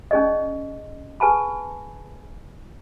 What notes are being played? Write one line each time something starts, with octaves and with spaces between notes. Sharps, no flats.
C#4 D#4 G#4 D5 D#5
G#4 B4 G#5 A5 B5